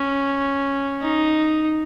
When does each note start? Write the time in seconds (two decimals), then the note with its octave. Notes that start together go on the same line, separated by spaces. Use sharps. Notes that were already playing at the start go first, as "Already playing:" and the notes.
Already playing: C#4
1.02 D#4